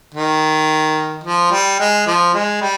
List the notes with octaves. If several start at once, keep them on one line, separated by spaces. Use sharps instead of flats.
D#3
F3
G3
G#3
F3
G#3
G3